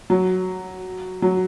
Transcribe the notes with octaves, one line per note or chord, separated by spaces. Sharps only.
F#3
F#3